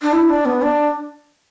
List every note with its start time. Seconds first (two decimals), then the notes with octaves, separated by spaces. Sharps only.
0.02 D4
0.13 E4
0.29 D4
0.45 B3
0.62 D4